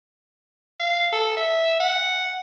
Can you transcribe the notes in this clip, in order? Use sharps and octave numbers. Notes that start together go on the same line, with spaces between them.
F5
A4
E5
F#5